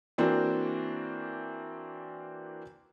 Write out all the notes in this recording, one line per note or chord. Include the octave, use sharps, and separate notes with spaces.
E3 A#3 C4 D4 F#4